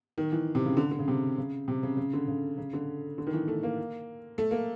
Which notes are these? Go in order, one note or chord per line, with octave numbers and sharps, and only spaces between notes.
D#3
E3
C3
C#3
D3
D3
C#3
C3
C#3
C3
C#3
C#3
D3
C#3
C#3
D3
D3
D#3
E3
A3
A#3
A3
A#3